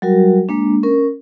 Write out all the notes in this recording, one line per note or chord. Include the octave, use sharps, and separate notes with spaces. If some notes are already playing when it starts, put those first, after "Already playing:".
F#3 G3 F#4 A#4
G#3 A#3 D4
C#4 A#4